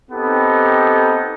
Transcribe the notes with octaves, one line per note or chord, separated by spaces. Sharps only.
B3 C4 D#4 G4 A4